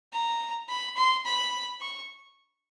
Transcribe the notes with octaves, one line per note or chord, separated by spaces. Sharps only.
A#5
B5
C6
B5
C#6